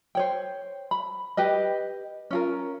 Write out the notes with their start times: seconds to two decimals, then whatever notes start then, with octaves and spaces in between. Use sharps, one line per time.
0.15 C5 C#5 G5
0.91 B5
1.37 G4 B4 D#5
2.31 C#4 F4 A#4